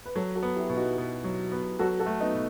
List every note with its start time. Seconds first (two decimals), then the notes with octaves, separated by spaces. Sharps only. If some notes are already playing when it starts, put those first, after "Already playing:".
0.06 B4
0.15 F#3 F#4 A4
0.35 F#4 A4
0.43 B3
0.56 E4 G4
0.70 B2
0.77 D#4 F#4
0.98 B2
1.24 F#3
1.52 B3
1.79 F#3 F#4 A4
1.99 F#4 A4
2.06 A3
2.20 B3 D#4
2.34 B2